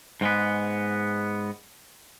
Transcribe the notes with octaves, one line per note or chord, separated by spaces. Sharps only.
G#2 G#3 B3